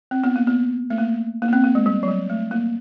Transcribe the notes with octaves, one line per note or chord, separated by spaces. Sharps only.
C4
B3
A#3
B3
A3
A#3
A#3
B3
C4
A#3
G#3
G3
F#3
G3
A3
A#3